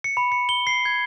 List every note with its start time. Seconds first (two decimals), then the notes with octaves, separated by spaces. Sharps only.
0.04 C#7
0.17 B5
0.32 C#7
0.49 G7
0.67 C7
0.85 G#6